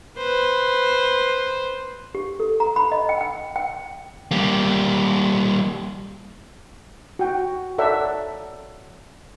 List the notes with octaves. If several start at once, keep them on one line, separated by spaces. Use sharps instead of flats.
B4 C5
G4
A4
A#5
B5
D#5
G5
G5
G5
G3 A#3
F#4 G5
A4 A#4 C#5 D5 E5 F#5